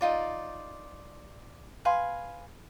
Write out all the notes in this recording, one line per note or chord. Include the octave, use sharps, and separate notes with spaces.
D#4 F4 D5
B4 F5 G#5 C6